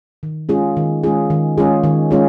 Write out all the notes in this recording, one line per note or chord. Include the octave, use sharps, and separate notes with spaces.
D#3
G#3 C#4 F4 G#4
D#3
G#3 C#4 F4 G#4
D#3
G#3 C#4 F4 G#4
D#3
G#3 C#4 F4 G#4